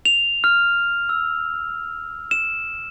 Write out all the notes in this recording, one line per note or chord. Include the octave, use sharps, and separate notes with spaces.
F7
F6
E6
E7